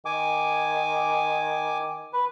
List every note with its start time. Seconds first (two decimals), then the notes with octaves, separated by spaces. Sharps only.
0.05 D#3 G#5 D6
2.13 B4